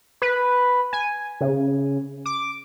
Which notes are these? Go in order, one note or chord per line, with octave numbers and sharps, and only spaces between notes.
B4
G#5
C#3
D6